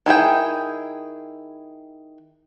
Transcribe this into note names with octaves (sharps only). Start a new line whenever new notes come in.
D#3 E4 G#4 G5